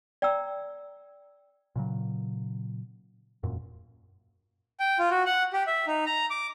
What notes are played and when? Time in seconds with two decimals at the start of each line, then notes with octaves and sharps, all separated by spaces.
0.22 D5 G5 A#5 E6
1.76 A#2 C#3 F#3
3.43 E1 F#2 A#2
4.80 G5
4.99 F4
5.11 F#4
5.26 F#5
5.53 G4
5.67 E5
5.87 D#4
6.07 A#5
6.30 D6